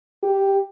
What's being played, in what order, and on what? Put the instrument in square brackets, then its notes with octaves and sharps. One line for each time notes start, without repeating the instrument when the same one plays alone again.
[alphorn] G4